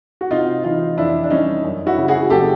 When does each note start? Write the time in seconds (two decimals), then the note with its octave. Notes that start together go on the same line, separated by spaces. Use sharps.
0.21 F#4
0.31 C3 D#4 F4
0.64 E3 D#4 F4
0.97 F2 D4 E4
1.24 D4
1.30 G3 C#4 D#4
1.64 F#2
1.86 E4 F#4
1.97 C#3
2.08 F#4 G#4
2.30 F#1 G4 A4